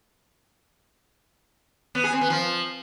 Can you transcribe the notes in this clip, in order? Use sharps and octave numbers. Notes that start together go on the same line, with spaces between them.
B3
G#4
C4
B3
F3